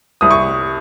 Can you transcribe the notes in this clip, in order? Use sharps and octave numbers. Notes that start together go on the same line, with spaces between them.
C2 D#6
C#6